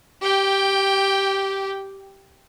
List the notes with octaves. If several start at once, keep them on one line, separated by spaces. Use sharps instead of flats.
G4 G5